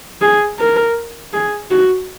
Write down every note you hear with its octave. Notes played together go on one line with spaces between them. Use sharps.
G#4
A#4
G#4
F#4